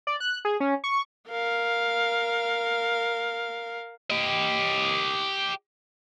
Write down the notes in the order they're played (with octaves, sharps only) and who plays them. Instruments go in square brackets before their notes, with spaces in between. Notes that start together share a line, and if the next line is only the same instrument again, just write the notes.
[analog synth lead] D5
F#6
G#4
C#4
C#6
[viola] A#4 F5
[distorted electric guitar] G4 D#5